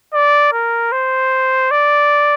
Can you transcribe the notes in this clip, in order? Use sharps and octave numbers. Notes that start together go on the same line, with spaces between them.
D5
A#4
C5
D5